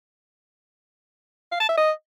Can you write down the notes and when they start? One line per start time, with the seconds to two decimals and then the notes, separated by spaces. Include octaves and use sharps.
1.52 F5
1.60 A5
1.69 E5
1.77 D#5